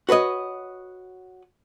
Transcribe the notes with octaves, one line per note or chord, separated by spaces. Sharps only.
F#4 B4 C#5 D#5